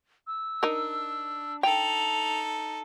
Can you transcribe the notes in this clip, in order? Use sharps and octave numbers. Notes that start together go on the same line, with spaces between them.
E6
D4 D#4 A#4
D#4 A4 G5 F7